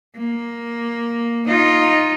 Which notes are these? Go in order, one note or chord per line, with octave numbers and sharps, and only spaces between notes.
A#3
D#4 F4